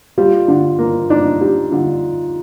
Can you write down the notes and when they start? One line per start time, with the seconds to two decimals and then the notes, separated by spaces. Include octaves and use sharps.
0.18 G3 F4
0.48 D3
0.79 A#3
1.10 D4 D#4
1.41 G3 D#4
1.72 D3 F4